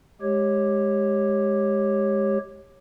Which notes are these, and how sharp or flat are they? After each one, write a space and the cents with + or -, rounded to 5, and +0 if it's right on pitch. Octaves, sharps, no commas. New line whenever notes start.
G#3 +0 G4 +5 C#5 -15